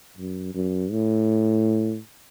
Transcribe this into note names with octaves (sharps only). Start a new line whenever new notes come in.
F#2
F#2
A2